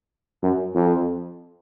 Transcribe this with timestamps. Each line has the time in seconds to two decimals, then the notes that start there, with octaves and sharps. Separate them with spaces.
0.43 F#2
0.75 F2